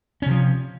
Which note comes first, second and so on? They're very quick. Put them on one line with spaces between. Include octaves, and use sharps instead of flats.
C#4 C3 F3